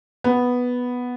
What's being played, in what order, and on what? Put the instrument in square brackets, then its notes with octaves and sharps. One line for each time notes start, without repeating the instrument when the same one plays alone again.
[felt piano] B3